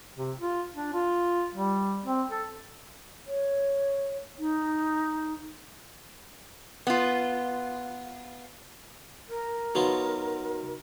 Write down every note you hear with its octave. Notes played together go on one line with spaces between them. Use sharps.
C3
F4
D4
F4
G3
C4
A4
C#5
D#4
B3 F4
A#4
F#3 B3 D#4 F4 F#4